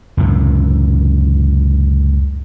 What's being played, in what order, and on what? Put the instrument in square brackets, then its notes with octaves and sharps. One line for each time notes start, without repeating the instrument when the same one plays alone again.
[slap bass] C#2 F#2 A2 C3